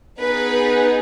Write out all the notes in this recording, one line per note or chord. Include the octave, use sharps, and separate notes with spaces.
B3 D#4 G#4 B4